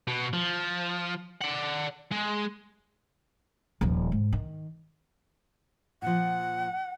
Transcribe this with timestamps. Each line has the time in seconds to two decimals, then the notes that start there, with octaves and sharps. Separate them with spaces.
0.07 B2
0.33 F3
1.41 D5 F#5
2.12 G#3
3.81 D#1 F3
4.12 G#2
4.33 D#3
6.02 A#2 F3 F#5